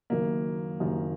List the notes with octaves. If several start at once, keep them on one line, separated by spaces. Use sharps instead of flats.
F#1 F#2 D#3 A#3
F#1 F#2 D#3